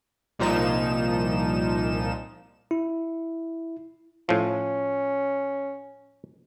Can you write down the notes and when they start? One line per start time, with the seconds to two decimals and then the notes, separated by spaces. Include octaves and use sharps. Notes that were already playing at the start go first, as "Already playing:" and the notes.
0.39 C2 A#2 F3 D#4 E7
2.71 E4
4.29 A2 F3 C#4